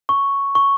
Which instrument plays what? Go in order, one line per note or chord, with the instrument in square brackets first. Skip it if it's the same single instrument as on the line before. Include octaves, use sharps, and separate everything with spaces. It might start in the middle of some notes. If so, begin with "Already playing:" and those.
[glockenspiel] C#6
C#6